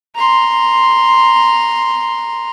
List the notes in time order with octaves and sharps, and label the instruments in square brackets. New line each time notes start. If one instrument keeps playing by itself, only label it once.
[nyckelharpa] A#5 C6